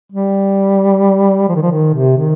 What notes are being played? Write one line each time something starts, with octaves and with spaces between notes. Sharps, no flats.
G3
F3
D#3
F3
D#3
C3
D#3